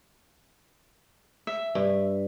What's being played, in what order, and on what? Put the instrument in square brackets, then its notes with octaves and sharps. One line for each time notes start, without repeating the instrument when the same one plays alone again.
[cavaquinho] E5
[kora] G2